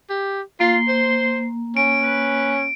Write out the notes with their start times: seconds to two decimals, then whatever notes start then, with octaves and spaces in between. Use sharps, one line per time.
0.10 G4
0.60 A#3 F4 C6
0.88 C5
1.77 C#4 D7
2.02 B4